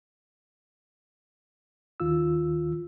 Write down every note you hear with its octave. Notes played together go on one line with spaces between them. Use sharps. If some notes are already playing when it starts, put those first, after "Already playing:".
D#2 D#3 F4 E6